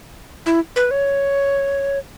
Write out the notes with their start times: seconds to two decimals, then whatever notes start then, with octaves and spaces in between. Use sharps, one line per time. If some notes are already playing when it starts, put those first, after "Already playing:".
0.46 E4
0.76 B4
0.91 C#5